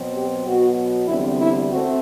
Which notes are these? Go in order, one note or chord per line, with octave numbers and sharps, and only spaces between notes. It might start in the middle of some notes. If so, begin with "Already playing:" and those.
Already playing: B2 F#3 C4
G4
B2 F#3 B3 F#4
E2 D3 G3 C4 E4
E4
A3 C4 F#4